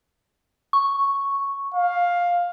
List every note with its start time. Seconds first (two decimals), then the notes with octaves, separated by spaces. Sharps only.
0.73 C#6
1.74 F5